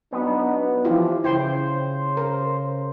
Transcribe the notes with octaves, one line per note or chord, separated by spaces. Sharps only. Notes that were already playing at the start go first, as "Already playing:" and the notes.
F#3 B3 D4 D#4
E3 F3 E4 F4 G4
C#3 E4 C5 G5 C6
A#4